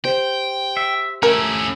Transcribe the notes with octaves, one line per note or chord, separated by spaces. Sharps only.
G4 C5 G5
E5
A3 C#4 E4 A#4